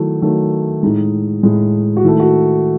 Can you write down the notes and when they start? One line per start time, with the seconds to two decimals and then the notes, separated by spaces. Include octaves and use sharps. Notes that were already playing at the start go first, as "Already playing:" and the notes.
Already playing: D#3 F#3 A3 E4
0.22 D#3 F#3 A3
0.83 A2 G#3 D#4
1.43 A2 G#3
1.97 F#4
2.04 D#3 A3 E4
2.20 F#4